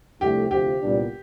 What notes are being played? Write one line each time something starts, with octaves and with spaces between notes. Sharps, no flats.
C2 C3 F3 A3 D4 G4
D2 C3 F3 G4
C2 A#2 G3 B3 D4